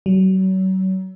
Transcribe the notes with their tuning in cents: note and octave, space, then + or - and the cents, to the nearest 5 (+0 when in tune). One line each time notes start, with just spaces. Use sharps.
F#3 +35